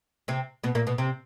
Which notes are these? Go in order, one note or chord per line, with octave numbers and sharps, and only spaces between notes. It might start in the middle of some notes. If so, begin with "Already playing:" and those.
C3 C4
B2 B3
A#2 A#3
B2 B3
C3 C4